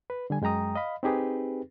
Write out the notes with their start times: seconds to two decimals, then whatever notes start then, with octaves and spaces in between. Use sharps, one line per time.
0.10 B4
0.30 D3 G3 G#5
0.42 F#2 G#3 G5 A#5 D#6
0.76 D#5 F5 B5
1.03 C4 D#4 G4 G#4 B4